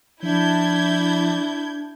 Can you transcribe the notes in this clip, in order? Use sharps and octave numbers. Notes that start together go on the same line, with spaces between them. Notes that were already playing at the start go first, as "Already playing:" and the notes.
F3 D4 E4 G6 G#6